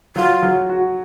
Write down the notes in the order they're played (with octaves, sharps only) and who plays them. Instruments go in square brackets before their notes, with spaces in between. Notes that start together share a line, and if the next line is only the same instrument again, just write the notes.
[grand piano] F#3 [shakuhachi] F4
[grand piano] F#3
F#4